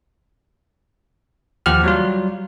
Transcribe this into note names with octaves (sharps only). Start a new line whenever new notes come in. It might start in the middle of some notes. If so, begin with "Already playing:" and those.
D#2 F3 G4 F#5 F6
F#3 G3 F4